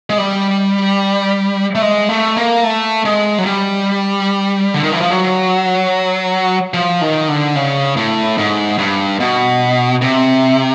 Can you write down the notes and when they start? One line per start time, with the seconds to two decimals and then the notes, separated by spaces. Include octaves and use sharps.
0.10 G#3
0.18 G3
1.75 A3
1.82 G#3
2.09 A3
2.37 A#3
2.64 A3
3.05 G#3
3.38 F#3
3.46 G3
4.74 D3
4.83 D#3
4.92 E3
5.01 F3
5.10 F#3
6.74 F3
7.01 D#3
7.28 D3
7.56 C#3
7.97 A2
8.38 G#2
8.78 G2
9.20 B2
10.02 C3